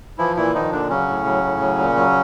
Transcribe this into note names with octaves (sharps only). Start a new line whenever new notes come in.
E3 F3 E4
A#2 E3 E4
D#3 F3 D#4
A#2 D3 D4
C#3 F#3 C#4
A2
F#3
A2
F#3
A#2
F#3